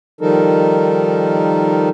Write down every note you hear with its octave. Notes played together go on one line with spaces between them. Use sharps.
D#3 F3 G3 D#4 A4 A#4